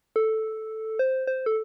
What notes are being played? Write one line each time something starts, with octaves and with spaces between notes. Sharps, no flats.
A4
C5
C5
A4